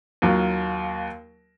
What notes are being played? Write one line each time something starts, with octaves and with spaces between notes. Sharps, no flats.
D#2 F#3 F4